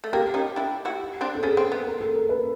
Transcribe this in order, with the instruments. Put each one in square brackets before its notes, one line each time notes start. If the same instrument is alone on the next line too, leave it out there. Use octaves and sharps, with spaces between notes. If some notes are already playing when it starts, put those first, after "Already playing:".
[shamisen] A3
[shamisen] A#3 [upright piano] G4
[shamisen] C#4 D#4
D4 E4
E4 F#4
C4 D4
[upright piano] A4
[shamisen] B3 C#4 [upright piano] G#4
[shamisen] C4
B3
[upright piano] A#4
A4
A#4
B4